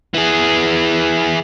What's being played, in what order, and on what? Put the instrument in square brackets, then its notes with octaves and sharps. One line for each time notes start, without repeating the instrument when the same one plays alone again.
[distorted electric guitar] E3 G#4